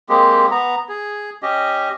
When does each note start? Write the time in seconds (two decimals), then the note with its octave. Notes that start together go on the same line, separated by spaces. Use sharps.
0.09 G#3 A#3 C4 G4
0.51 B3 A#5
0.89 G#4
1.43 C#4 G4 D#5